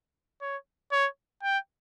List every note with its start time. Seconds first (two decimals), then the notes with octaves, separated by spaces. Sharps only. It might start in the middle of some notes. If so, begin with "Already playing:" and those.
0.42 C#5
0.92 C#5
1.43 G5